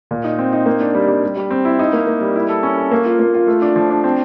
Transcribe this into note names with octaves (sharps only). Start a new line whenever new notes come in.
A#2
D#4
C4
D#4
A#3
D4
G3
G3
G3
G3
C4
E4
D#4
A#3
A#3
G3
E4
A4
C#4
A4
A#3
F4
A#3
F4
A3
D4
F3
D4
C4